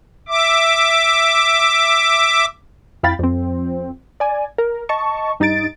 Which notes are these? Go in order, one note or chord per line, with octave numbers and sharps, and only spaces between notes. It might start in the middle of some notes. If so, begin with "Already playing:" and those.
E5 D6
F2 E4 F5 G5 B5 A6
F2 C4
D5 G#5
A#4
D#5 A5 C#6
G2 D#4 D#5 A6 D7